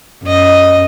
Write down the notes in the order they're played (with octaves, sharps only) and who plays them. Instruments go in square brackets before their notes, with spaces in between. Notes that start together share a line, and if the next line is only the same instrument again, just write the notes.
[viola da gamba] F#2 D#5